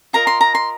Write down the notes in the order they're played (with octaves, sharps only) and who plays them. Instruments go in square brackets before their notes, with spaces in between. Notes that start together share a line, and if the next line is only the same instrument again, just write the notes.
[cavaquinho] F4 A#4 D#5 A#5
C6
A#5
C6